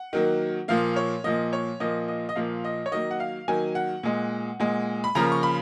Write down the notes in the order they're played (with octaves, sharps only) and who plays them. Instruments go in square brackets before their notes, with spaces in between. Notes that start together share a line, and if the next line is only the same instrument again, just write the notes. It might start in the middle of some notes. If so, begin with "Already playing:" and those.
Already playing: [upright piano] F#5
D#3 F#3 A#3
A#2 F3 A#3 F5
C#5
A#2 F3 A#3 D#5
C#5
A#2 F3 A#3 D#5
D#5
D#5
A#2 F3 A#3 F5
D#5
C#5
D#3 F#3 A#3 D#5
F#5
F5
D#3 F#3 A#3 G#5
F#5
A#2 G#3
A#2 G#3
B5
C#3 F3 A#3 A#5
C#6
B5